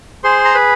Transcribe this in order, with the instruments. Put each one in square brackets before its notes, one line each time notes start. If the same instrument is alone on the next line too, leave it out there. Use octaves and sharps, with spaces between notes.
[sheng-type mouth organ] G#4 C5 C6
A#5
B4 B5